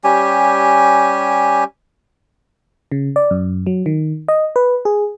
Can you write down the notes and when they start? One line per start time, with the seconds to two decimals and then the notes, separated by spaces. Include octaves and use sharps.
0.04 G3 C#4 G4 G#5
2.92 C#3
3.16 D5
3.31 F#2
3.67 F#3
3.86 D#3
4.28 D#5
4.56 B4
4.85 G#4